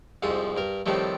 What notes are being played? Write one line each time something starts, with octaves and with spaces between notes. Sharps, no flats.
C2 F2 G#2 F3 D#6
G2 A#4
A2 C3 D#3 F3 G3 A3